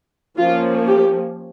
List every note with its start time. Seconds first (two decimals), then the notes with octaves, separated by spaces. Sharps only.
0.37 F3 A#3 C#4 F4
0.86 G4